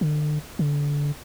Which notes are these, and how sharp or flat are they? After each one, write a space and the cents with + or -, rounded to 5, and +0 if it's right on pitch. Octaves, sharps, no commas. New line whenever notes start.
D3 +35
D3 -20